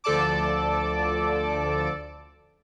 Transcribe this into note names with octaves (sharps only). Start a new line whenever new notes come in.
D2 F3 A4 D5 A5 D6